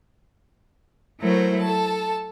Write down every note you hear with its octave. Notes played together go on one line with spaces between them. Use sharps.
F#3 A3 E4 A#4 C5
A4 A5